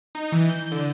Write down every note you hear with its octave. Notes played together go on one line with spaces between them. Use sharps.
D#4
E3
G6
D3